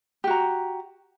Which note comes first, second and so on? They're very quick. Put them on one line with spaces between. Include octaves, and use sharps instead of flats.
G4 F#4 A#5